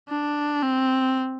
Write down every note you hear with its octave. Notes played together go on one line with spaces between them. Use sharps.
D4
C4